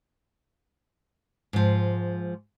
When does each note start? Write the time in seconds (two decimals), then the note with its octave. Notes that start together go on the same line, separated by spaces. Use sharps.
1.53 G#2 F3